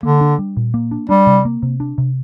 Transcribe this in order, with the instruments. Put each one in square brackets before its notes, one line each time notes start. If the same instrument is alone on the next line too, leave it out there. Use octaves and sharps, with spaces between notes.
[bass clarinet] D3 [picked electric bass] A#3
[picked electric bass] D4
G3
A#2
A#3
D4
[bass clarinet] G3 [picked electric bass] D4
[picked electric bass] C3
A#3
C3
D4
C3